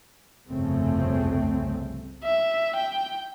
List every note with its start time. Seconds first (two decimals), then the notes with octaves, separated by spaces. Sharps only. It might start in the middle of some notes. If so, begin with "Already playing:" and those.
0.49 G1 C2 F2 C#3 A3 C4
2.24 E5
2.76 G5